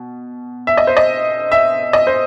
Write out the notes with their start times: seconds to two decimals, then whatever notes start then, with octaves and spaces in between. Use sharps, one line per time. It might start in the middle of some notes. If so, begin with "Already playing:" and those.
Already playing: B2
0.67 E5
0.77 D#5
0.87 C5
0.97 D#5
1.52 E5
1.93 D#5
2.07 C5